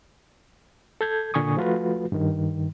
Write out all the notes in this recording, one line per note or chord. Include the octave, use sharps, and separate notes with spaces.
A4 G6 G#6
A#2 D3 G#5 C#6 D#6
F3 A3 F4 F#4 B4
G2 D#3